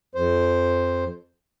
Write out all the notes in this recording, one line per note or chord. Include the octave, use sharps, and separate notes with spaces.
F2 C5